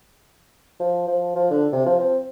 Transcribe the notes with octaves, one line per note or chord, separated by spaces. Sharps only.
F3
F3
F3
D3
C3
F3
C4